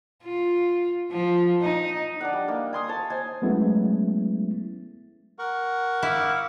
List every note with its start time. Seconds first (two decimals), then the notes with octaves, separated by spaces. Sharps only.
0.23 F4
1.12 F3
1.62 D#4
2.21 D4 D5 F#5
2.33 G3
2.48 A#3 D#4
2.73 G#5 C6 D#6
2.88 C#5 A5
3.10 C5 D#5 G#5
3.42 F#3 G#3 A3 B3 C#4 E4
5.39 A#4 F#5 C#6
6.03 E4 F5 D6